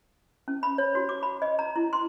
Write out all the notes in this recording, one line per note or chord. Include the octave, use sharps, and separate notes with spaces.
C#4
B5
C#5
F#4
D6
B5
D#5
A#5
E4
C6